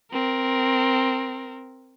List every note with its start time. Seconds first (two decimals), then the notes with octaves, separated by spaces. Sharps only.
0.12 C4 A#4